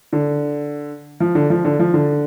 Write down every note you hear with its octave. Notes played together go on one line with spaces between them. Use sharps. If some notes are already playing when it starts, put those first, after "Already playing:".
D3
F3
D3
F3
D3
F3
D3